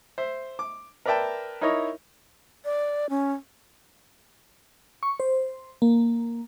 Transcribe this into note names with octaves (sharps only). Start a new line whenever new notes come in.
C5 E5
D6
A#4 B4 D5 E5 G5 A5
D#4 E4 A#4 C#5 D#5
D5
C#4
C#6
C5
A#3